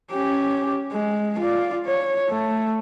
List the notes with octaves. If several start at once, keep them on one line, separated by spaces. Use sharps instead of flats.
C#4 G4
G#3
F4 D5
C#5
A3